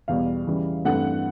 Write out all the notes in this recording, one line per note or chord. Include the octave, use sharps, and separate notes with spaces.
E2 B2 G3 F5
C#3 E3 G3
G2 E3 A3 C4 F#5